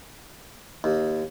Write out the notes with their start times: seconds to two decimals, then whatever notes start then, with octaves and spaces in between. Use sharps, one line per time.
0.84 D#2